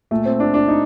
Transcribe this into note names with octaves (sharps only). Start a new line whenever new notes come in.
A#2 A3
C4
D4
D4
D#4